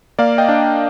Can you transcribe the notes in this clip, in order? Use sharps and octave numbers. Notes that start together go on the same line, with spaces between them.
A#3 D5 F5
D#5 G5
D4